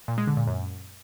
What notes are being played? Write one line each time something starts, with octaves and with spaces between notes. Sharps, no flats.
A#2
G#3
D3
A#2
F#2